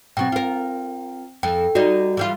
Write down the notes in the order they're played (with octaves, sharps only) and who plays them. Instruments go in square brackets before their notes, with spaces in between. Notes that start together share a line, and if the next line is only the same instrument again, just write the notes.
[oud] B2 F#3 [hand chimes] C4 G5
[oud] F4 A#4
[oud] F2 A4 [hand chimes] G5
[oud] G3 D#4 [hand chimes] F#4 D5
[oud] E3 G3 F4